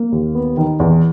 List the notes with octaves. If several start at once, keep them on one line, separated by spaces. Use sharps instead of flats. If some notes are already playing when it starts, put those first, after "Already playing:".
Already playing: A#3
D#2
B3
D#3
E2